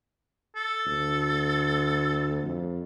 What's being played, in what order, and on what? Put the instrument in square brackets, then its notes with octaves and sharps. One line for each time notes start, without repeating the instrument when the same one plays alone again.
[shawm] A4
[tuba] D2
F2